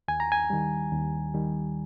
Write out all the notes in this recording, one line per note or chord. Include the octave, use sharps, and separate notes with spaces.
D#2 G#5
A#5
G#5
D#3 G3
D#2
D#3 G3